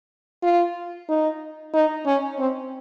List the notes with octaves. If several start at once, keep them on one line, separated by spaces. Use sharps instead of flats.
F4
D#4
D#4
C#4
C4